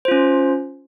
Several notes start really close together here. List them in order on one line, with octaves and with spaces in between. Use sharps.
C5 F4 C#4